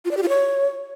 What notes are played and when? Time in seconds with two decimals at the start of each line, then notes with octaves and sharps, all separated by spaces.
0.05 F4
0.11 D5
0.17 G4
0.23 F4
0.29 C#5